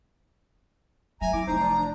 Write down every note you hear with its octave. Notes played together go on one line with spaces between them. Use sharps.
F2 F#3 E5 G#5 A#5
C4 E4 D6
F1 D#4 C5 A#5
F3 D5
D4